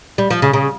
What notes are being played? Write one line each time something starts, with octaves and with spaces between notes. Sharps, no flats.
G3
F3
C#3
C#3